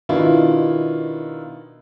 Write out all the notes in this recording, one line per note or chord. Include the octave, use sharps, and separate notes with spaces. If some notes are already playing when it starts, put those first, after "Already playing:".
B2 D#3 D4 E4 F4